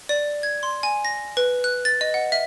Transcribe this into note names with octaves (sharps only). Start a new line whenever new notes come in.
D5
G#6
C6
G#5
A#6
B4
F#6
A6
D#5
F#5
E5